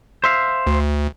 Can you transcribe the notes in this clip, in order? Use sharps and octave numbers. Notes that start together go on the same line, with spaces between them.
C5 E5 F5
D2